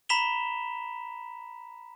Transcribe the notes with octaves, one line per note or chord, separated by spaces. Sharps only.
A#5 B5 B6 E7 F7 G7